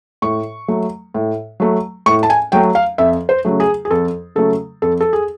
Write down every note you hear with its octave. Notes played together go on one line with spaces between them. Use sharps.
A2 C#6
F#3 A3
A2
F#3 A3
A2 C#6
A5
G#5
F#3 A3 G5
F5
F2 E5
C5
C#3 F#3 A3
G#4
G#4
F2 A4
C#3 F#3 A3 A4
F2 A4
A4
G#4